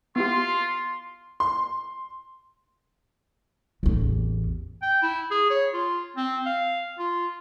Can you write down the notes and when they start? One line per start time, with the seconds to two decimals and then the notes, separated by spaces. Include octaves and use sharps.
0.16 B3 E4 F4 G4 C6
1.40 C6
3.83 A1 E2
4.82 G5
5.02 E4
5.31 G#4
5.50 C#5
5.74 F4
6.16 C4
6.46 F5
6.99 F4